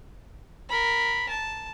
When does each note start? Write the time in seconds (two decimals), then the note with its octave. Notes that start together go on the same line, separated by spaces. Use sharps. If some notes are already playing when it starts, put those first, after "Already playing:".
0.69 A#4 B5
1.29 A5